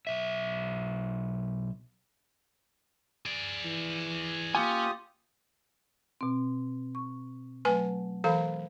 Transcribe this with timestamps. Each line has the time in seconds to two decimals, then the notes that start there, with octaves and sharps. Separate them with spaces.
0.07 B1 E5
3.26 G#4 D5
3.65 E3
4.55 A#3 C#4 F4 G4 G#5 D#6
6.21 B2 C4
6.95 C#6
7.65 F#3 A3 B4 G#5
8.24 E3 A4 C5 F5 B5